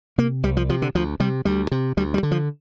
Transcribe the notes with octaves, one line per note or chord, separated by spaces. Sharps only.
C3 A#3
C2 G3
F3
C3 F3
D3
D2 F3
C3 G3
D2 G3
C3
D2 G3
G3
D3
F3